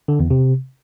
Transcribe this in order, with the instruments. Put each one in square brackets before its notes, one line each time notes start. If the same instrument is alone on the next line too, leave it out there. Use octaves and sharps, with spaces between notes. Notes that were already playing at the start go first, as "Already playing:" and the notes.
[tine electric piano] D3
E2
C3